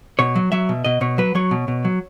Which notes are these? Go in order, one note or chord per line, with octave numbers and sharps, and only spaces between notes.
B2 C#5
F#3
F#3 E5
B2
B2 D#5
B2 C#5
F#3 B4
F#3 C#5
B2
B2
F#3